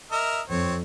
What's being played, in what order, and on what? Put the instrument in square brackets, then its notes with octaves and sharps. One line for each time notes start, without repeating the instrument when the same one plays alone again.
[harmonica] A#4 D#5 E5
[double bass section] F2 [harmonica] C4 C#5